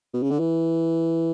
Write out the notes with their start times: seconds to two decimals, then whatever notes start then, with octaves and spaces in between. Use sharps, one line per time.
0.14 B2
0.23 C#3
0.31 D3
0.40 E3